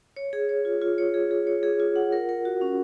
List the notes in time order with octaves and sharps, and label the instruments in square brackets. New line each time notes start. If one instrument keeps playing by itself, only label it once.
[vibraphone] C#5
G#4
C#5
F4
F4
C#5
G#4
G#4
C#5
G#4
F4
F#5
A#4
A#4
F#4
C#4